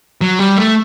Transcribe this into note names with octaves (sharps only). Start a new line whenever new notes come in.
F#3
G3
A3